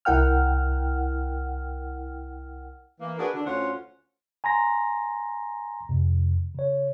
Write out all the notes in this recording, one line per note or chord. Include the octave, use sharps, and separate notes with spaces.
C2 E4 A#4 F#5 G5 F6
E3 A#3
D4 F#4 G#4 A#4 B4
D3 D4
D2 C#4 F4 C5 F#5
G#5 A#5 C6 A#6
F2 C3
C#3 C#5